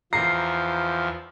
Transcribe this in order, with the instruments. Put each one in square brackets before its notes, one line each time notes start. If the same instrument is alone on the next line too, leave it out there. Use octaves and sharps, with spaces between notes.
[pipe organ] E2 F3 [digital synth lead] A#5 [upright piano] C7